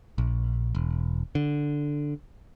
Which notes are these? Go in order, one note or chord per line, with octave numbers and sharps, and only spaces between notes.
A#1
E1
D3